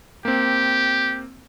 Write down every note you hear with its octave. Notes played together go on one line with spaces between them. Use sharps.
A#3 C4 G4